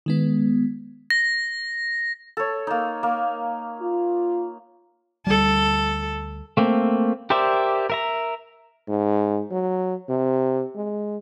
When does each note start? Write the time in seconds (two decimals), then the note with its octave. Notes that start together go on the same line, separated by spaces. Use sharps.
0.06 D#3 G#3 B3
1.10 A#6
2.37 A4 C#5
2.67 A#3 D#4
3.03 A#3
3.80 F4
5.27 D2 G3 A4
6.57 A3 A#3 C4
7.30 G4 A#4 C5 D5 E5
7.90 A#4 E5 A#5
8.88 G#2
9.51 F#3
10.09 C3
10.76 G#3